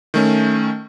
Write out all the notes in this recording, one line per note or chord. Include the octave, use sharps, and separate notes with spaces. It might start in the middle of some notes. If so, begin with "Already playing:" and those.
D#3 A3 C#4